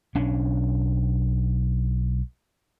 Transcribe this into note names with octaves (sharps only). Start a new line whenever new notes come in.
B1 C#4 D4